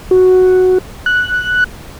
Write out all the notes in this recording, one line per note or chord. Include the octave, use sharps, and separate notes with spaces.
F#4
F#6